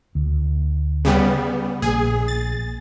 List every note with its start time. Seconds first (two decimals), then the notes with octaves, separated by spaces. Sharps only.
0.15 D2
1.05 C#3 G3 B3
1.82 A#1 A#3 G#4
2.28 A6